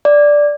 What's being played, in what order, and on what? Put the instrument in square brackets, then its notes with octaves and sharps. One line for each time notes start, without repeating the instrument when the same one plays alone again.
[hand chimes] D5